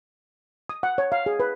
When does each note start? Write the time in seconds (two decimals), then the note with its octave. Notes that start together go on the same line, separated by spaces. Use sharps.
0.69 D#6
0.83 F#5
0.98 C#5
1.12 F5
1.26 G#4
1.40 B4